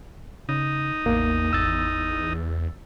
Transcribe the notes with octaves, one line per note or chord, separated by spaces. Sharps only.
C#3 D#4
A1 E2 A#3
G#1 E6 A6